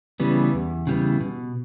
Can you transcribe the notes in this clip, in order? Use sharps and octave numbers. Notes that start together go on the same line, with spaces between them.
C#3 E3 G3 B3
E2
C#3 E3 G3 B3
B2